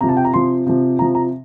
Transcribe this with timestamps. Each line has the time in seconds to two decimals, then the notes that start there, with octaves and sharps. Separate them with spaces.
0.01 C3 F3 A#5
0.09 A5
0.17 G5
0.25 A#5
0.33 C3 F3 C6
0.66 C3 F3
0.99 C3 A#5
1.02 F3
1.15 A#5